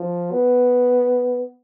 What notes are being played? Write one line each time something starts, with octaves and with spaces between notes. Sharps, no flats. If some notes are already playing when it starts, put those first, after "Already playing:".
Already playing: F3
B3